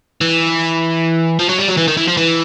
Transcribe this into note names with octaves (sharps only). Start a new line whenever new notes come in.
E3
F3
F#3
G3
F#3
E3
D#3
E3
F3
E3